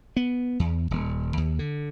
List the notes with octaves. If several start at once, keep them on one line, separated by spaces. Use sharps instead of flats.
B3
E2
D#1
D#2
D3